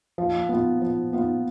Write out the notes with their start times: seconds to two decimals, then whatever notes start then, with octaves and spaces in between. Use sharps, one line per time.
0.18 F3
0.49 B3 F4
0.82 F3
1.13 B3 F4